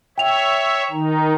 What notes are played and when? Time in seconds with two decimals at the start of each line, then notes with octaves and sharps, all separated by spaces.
0.18 C#5 E5 G5 F7
0.91 D#3 D#4